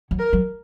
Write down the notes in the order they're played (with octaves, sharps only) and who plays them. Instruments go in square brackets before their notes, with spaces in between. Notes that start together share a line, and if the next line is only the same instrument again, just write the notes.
[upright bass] F#3
[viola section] A#4
[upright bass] F#3